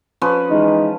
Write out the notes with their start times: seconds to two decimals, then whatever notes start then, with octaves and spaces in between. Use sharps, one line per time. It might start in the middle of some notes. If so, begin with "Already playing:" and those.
0.22 F3 C#4 B4
0.50 E3 G#3 D#4